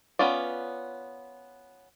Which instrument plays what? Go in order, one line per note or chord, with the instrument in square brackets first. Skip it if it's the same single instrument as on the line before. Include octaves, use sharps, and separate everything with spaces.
[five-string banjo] B3 C#4 F4 D5